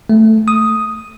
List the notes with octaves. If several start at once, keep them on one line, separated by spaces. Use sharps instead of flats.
A3
D#6